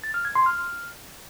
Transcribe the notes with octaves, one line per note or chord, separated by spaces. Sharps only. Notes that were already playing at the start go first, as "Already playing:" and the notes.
A6
F6
G#6
C6
F6